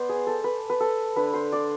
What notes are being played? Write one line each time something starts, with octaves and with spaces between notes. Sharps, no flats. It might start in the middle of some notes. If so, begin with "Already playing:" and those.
Already playing: B3 C5 D5
G#4
A4
B4
B4
A4
D3 B4
C5
D5